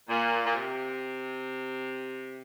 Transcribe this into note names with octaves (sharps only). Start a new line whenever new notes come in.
A#2
A#2
C3